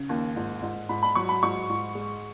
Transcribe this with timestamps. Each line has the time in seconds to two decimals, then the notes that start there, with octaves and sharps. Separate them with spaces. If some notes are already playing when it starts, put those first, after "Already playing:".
Already playing: C#3
0.09 D#2
0.36 G#2
0.62 G#2
0.89 G#2 B5
1.03 B5
1.15 F#3 C#6
1.29 B5
1.42 G#2 C#6
1.69 G#2
1.95 G#3